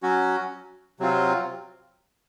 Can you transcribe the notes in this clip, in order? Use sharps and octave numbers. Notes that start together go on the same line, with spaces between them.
F#3 C#4 F#4
C3 F#3 C4 F4